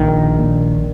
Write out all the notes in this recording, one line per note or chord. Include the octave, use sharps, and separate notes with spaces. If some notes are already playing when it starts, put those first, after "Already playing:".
Already playing: A#1 D#3
A#2